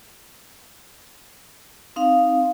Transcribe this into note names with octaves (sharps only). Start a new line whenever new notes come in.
C4 D#4 F5